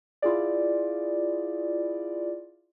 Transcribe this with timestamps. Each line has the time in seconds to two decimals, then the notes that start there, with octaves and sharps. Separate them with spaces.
0.22 E4 F4 G#4 D5